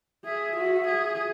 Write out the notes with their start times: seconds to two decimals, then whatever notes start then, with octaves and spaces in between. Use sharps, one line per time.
0.25 G#4 E5
0.57 F#4
0.88 G#4